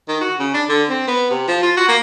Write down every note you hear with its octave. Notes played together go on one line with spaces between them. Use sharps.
D#3
F#4
C#3
D4
D3
C4
B3
C3
F3
F4
F#4
A#3